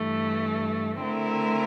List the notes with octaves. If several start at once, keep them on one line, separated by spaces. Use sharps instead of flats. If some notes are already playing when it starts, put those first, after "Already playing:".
Already playing: G2 E3 A3
D3 A3 C4 E4 A#4